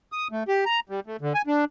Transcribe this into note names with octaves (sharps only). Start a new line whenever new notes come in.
D#6
A3
G4
A#5
G3
A3
D3
G#5
D4